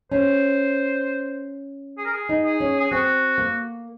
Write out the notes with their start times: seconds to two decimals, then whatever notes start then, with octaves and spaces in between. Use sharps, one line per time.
0.12 C#4 C5
1.98 G#4
2.05 A#4
2.13 G#4
2.29 D#4
2.45 G#4
2.60 C#4
2.80 G#4
2.91 C4 F#4
3.38 A#3